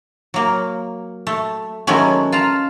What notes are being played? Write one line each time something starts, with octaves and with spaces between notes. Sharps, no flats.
F#3 A#3
A3
D#3 F#3 G#3 A3 B3 C#4
F4 A5 A#5